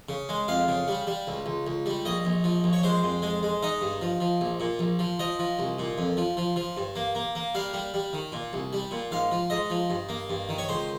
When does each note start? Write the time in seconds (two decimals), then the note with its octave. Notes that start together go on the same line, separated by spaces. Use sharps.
0.09 C#3
0.29 G#3
0.48 F2 F5
0.68 C#3
0.88 G3
1.07 G3
1.27 C#2
1.46 C#2
1.67 C#2
1.86 G3
2.05 A#1 D#5
2.25 A#1
2.44 F3
2.64 A#1
2.73 C#5
2.83 G#3 C5
3.03 F2
3.22 G#3
3.43 G#3
3.63 D#4 D#5
3.81 G2
4.02 F3
4.20 F3
4.41 A#1
4.60 A#2
4.79 A#1
4.99 F3
5.19 F3 D#5
5.39 F3
5.59 C2
5.79 A#2
5.98 F2
6.17 F3
6.37 F3
6.56 F3
6.77 G2
6.96 A#3
7.15 A#3
7.35 A#3
7.55 G3 F5
7.73 G3
7.94 G3
8.13 D#3
8.32 A#2
8.53 C2
8.73 G3
8.91 A#2
9.11 G#2 F5
9.31 F3
9.50 G#2 D#5
9.70 F3
9.90 G2
10.09 A#3
10.30 G2
10.49 D#3
10.58 C#5
10.69 C#2 C5